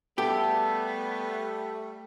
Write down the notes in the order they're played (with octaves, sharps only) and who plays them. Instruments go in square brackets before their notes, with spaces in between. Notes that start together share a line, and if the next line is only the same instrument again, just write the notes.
[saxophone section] G3 A3 [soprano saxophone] B3 [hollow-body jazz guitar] G4 [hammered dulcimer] A4